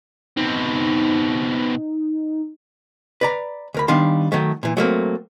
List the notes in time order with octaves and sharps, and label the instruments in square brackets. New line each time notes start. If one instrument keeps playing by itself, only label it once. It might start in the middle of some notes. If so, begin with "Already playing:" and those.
[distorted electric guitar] B2 C4 [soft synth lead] D#4
[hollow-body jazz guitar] B4 D5 A#5
D2 A#4 B5
D#3 G3 B3 D4 F5 C6
D#3 F#3 A3
A#2 E3
F#3 A3 A#3 C4